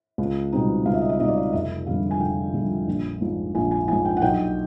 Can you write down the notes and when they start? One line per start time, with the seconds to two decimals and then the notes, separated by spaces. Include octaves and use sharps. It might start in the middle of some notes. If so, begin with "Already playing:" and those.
0.18 C#2
0.52 B2 G3 C4 D#4
0.86 C#2 F5
0.94 E5
1.01 D#5
1.09 E5
1.19 B2 G3 C4 D#4 D#5
1.28 D5
1.37 D#5
1.53 F1 E5
1.87 F2 D3 G3 F5
2.11 G#5
2.20 F1 G5
2.53 F2 D3 G3
2.87 A#1
3.21 G#2 F3
3.55 A#1 G#5
3.71 G#5
3.88 G#2 F3 G#5
4.05 G5
4.17 F#5
4.22 B1 G5